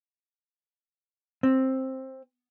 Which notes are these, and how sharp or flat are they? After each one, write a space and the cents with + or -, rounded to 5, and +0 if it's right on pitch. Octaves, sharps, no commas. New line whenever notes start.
C4 +10